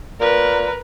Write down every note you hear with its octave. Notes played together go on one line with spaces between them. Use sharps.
A#2 A#4 B4